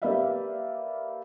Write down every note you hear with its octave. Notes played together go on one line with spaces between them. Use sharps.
A#3 G4 B4 D5 E5 F5